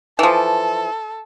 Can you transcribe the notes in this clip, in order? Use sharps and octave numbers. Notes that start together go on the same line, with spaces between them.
E3 F3 A4